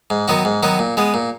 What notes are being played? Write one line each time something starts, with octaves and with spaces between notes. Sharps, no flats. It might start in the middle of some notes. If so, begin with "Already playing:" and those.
G#2
D#3 F#3 B3 F#4
G#2
D#3 F#3 B3 F#4
A#2
G#3 B3
A#2